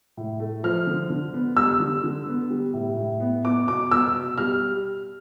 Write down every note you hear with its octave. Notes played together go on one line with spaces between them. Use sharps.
A2
A3
F3 F6
D3
D3
B3
G3 E6
D3
D3
B3
G3
A2
A2
B3
B3 D6
B2 D6
B3 E6
B2
G3 F6